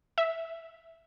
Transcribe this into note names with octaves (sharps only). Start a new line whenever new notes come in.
E5